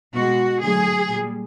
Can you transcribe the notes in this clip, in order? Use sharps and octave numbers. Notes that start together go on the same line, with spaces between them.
B2 G#3 F#4
D3 F#3 A3 G#4
A#2 G3